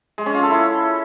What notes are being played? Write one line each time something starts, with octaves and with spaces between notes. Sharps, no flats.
G#3
C#4
F4
A4
E4